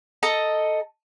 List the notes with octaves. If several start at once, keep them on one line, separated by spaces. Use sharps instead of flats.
A4 D#5 A#5